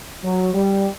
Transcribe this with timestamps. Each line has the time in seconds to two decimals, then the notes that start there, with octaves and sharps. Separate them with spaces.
0.24 F#3
0.54 G3